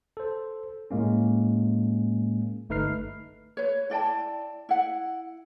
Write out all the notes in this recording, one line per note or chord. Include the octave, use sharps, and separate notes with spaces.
A4 C5
A2 G#3 A#3 C#4
G1 A3 D#4 B4 F6 C7
B4 C#5
E4 D5 G5 A5
E4 F#5